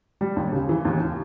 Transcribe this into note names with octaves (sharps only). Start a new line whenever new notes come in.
G3
D#2
C#3
E3
D#2